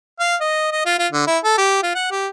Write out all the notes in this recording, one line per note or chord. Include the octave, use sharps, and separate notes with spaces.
F5
D#5
D#5
F4
F4
D3
E4
A4
G4
F4
F#5
G4